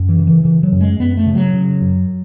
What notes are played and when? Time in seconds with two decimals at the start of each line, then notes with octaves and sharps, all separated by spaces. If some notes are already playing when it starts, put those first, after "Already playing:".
Already playing: F#2
0.09 E3
0.19 C#3
0.27 E3
0.45 C#3 E3
0.63 F#3
0.72 F#2
0.81 G#3
0.99 F#2 B3
1.17 A3
1.26 C#3
1.35 F#3
1.53 C#3
1.81 F#2